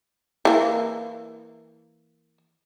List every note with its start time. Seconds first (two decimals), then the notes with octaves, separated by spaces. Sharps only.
0.45 E3 A#3